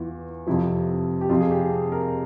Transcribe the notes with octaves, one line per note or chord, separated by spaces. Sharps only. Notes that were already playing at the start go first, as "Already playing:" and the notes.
Already playing: E2 E3 F4
F2 C3 F3 E4
G4
F2 C3 F3 F4
G#4
G4
G#4
A#4